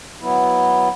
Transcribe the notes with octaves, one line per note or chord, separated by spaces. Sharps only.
F#3 B3 E4